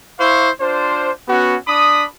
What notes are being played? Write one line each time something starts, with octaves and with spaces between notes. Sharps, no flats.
E4 C5 F5 C#6
D4 F4 C5
B3 C#4 F#4
D4 B5 D#6